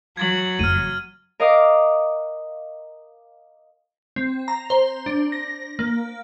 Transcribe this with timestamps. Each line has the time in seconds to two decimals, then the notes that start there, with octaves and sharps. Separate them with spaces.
0.17 F#3 G#6 A6 F#7
0.59 F#1 F2 F6 D#7
1.40 A#4 D#5 F5 D6 D#6
4.16 C4
4.48 A#5
4.70 C5
5.06 D4
5.32 A#6
5.79 A#3